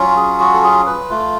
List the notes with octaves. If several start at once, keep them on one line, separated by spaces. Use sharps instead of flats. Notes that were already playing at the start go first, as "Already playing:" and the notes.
Already playing: F#3 C#4 F4
G#4
F#4
A4
G#4
B4
A3 F4